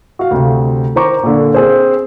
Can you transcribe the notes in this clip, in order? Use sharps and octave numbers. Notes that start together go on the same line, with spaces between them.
F#4 F5
D2 C3
D#3 D#4 C5 A#5 C#6 D6
A#2 D3
C4 G#4 C5